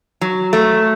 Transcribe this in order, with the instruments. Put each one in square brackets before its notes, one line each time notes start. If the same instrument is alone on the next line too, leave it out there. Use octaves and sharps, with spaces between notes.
[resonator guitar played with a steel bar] F#3
A3